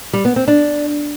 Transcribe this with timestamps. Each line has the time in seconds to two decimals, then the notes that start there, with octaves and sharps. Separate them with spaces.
0.13 G3
0.25 B3
0.36 C4
0.48 D4